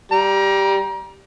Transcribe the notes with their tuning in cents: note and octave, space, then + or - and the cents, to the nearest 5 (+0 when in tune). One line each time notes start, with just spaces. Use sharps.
G3 +0 A#5 +30